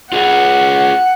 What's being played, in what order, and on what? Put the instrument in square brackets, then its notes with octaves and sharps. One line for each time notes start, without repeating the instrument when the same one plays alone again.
[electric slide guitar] F4 G#4 [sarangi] F#5